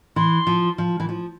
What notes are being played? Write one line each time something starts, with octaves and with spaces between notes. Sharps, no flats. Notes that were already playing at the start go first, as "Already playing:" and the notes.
E3 C6
F3
F3
E3
F3